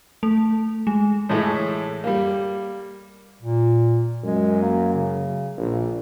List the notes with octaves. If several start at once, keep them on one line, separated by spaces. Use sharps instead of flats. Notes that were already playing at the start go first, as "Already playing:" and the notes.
A3
G#3
A2 E3 G#3 A3 E4
G3 A#3
A#2
F#2 G#3
A#3
C#3
A#1 A#2